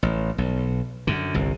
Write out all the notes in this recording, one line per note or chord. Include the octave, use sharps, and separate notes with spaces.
A1
B1
F#2 D3
G1 C2